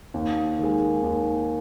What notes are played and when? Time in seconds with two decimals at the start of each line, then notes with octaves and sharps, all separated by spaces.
0.14 D#2
0.58 D#3 G#3
1.03 D#2